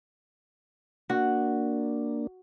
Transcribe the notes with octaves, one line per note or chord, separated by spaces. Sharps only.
A#3 D4 F#4